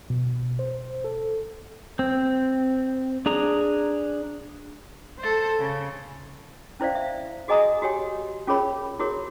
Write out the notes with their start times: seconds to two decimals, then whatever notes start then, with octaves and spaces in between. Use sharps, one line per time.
0.10 B2
0.59 C5
1.04 A4
1.99 C4
3.26 D4 G#4 A#5
5.19 A4 C5
5.59 C#3
6.80 C#4 E4 C5 D5 F5
6.95 E5
7.48 F#4 G#4 D#5 G#5 A#5 D#6
7.82 F#4 G4 C#5 G#5
8.47 C#4 F4 G#4 A#4 C#5 B5
8.99 E4 F#4 G#4 A#4 C#5